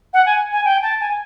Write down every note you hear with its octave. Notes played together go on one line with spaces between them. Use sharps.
F#5
G#5
G#5
G5
A5
G#5